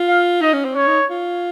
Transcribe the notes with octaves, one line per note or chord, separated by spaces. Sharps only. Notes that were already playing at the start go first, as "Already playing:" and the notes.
Already playing: F4
F5
D#4 D#5
C#4
C4
C#4 C#5
D#4
F4